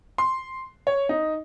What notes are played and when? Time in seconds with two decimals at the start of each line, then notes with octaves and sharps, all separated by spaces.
0.18 C6
0.87 C#5
1.09 D#4